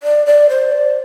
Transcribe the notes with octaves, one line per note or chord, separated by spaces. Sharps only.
D5
D5
C5
D5